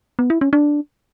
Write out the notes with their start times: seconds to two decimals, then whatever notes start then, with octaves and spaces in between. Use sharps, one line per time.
0.19 B3
0.30 E4
0.41 C#4
0.53 D4